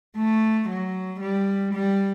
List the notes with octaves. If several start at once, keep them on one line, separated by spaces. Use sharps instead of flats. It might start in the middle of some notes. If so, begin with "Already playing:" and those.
A3
F#3
G3
G3